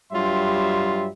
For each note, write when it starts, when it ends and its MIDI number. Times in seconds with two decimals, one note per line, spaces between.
0.13 1.08 43
0.13 1.08 54
0.13 1.08 55
0.13 1.08 65
0.13 1.08 76
0.13 1.08 84